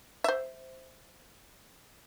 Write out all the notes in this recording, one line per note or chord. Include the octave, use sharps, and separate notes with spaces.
C5 E5